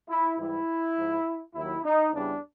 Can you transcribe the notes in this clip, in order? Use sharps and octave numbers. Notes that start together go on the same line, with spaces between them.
E4
G#2 E3 G3 E4
G#2 F3
D#2 D#3 F#3 E4
D#4
E2 C#3 E3 G3 D4